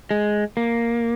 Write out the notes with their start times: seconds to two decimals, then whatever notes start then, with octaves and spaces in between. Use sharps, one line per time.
0.11 G#3
0.57 A#3